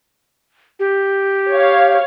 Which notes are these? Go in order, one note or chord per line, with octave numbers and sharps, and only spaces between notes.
G4
C#5 F5